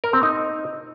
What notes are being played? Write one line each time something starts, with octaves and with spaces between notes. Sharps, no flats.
A#4
C4
D#4